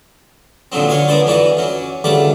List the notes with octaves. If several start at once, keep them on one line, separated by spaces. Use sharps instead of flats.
B1 A#2 D3 F3 F#3 C4
D3 F#3 C#5 F5 G#5
A#3 B3 D4 C5 D5
F2 E3 D4 F#4 D6
F#3 C#4
C#2 D3 G3 A3 D5 D6